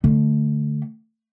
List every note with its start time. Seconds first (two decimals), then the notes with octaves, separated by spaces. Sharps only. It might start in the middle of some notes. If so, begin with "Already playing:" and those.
0.04 D3 A3